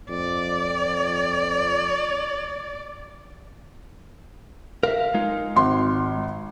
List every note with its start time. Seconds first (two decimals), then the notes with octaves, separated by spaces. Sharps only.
0.10 F2 D5
4.83 A#4 E5 F5
5.14 G#3 D#4 F4
5.56 G#1 C6